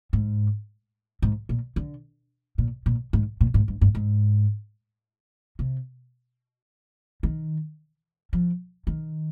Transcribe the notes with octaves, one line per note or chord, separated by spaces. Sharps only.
G#2
G#2
A#2
D3
A#2
A#2
G#2
A#2
G#2
G2
G2
G#2
C3
D#3
F3
D#3